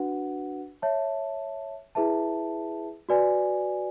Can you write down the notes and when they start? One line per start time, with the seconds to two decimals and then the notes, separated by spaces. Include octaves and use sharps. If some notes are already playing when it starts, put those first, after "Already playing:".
Already playing: D4 F#4 B4 F#5
0.82 C#5 E5 A5
1.95 E4 G#4 B4 E5 A5
3.09 F#4 B4 D5 G#5